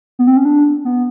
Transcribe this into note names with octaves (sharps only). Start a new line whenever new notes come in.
B3
C4
C#4
D4
B3